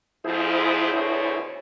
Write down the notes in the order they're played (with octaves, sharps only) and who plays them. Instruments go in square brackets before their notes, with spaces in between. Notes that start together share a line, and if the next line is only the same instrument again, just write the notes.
[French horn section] F2 G#2 F3 [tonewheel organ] E4 G#4 C5
[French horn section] D2 B2 C#5